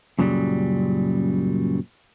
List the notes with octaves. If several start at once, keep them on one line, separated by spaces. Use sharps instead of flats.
F#2 A#2 C#3 F#3 G3